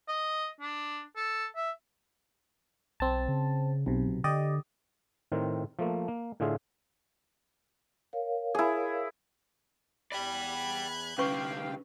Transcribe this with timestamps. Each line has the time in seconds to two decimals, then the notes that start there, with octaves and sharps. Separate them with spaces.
0.08 D#5
0.60 D4
1.16 A4
1.56 E5
3.00 B1 C4 A5
3.28 C#3
3.86 B1 C3
4.08 B2
4.24 D3 G4 D5 D#5
5.32 A2 D#3 C4 A#4 C5
5.79 F3 A3 A#3
6.08 A#3
6.40 A2 D3 F4 G#4 E5 F5
8.13 A#4 C#5 F5
8.55 E4 G#4
10.12 E2 D5 G5 B5 F#6 G#6
11.18 C2 D3 C#4 B4 F5 G5 C#6